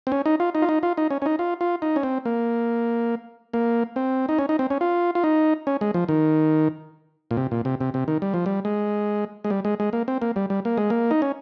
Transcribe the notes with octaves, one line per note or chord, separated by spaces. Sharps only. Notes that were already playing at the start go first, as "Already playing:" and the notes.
C4
C#4
D#4
F4
D#4
F4
D#4
F4
D#4
C#4
C#4
D#4
F4
F4
D#4
C#4
C4
A#3
A#3
C4
D#4
C#4
D#4
C4
C#4
F4
F4
D#4
C#4
G#3
F3
D#3
A#2
C3
A#2
C3
C3
C3
D#3
G3
F3
G3
G#3
G#3
G3
G#3
G#3
A#3
C4
A#3
G3
G3
A#3
G#3
A#3
D#4
C#4